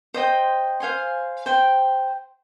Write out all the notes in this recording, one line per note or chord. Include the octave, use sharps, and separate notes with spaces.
C5 D#5 G5 C6
C5 F5 G#5 C6
C5 G5 C6